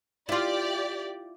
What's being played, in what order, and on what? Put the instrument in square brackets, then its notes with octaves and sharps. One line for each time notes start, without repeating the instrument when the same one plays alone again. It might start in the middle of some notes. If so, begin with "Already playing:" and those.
[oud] E4 F4 [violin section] G4 D5